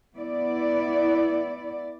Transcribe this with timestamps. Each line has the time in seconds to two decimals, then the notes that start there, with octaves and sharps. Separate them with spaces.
0.17 B3 E4 D5